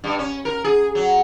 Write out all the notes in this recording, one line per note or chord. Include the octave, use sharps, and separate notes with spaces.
G2
C#4
A#4
G#4
F#3